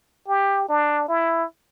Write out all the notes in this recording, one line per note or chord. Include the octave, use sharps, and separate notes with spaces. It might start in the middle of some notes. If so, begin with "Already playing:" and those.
G4
D4
E4